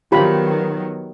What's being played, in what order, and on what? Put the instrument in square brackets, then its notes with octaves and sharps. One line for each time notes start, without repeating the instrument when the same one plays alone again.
[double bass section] D#3 F#3 B3 [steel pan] F4 G4 B5